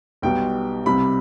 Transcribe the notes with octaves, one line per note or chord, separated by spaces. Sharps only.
B1 B2 G3 G5
C2 C3 G3 B5